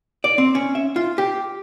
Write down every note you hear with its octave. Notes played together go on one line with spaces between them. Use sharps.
D5
C4
C#4
E5
F4
G4